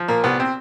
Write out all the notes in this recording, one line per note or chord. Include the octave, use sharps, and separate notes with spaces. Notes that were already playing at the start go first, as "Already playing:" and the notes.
Already playing: F3
A#2 A#3
C2 B3
C4